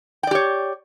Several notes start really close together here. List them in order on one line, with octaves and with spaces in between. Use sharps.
G5 D5 G4 C#5